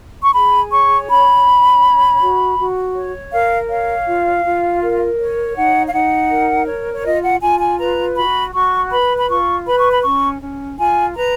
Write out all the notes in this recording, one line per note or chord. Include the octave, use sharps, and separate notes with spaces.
C#6
G#4 B5
C#5 C#6
C#4 B5
C#4
C#5
F#4
F#4
C#5
A#4 F5
C#5 F5
F4
F4
A#4
C#5
D#4 F#5
F5
D#4 F#5
A#4
C#5
C#5
F4 D#5
F#5
F4 G#5
G#5
B4 A#5
F#4 B5
F#4 C#6
B4 B5
B5
F4 C#6
B4 B5
C#6
B5
C#4 C#6
C#4
F4 G#5
B4 A#5